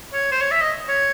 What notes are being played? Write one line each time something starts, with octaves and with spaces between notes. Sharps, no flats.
C#5
C5
C#5
E5
D#5
C#5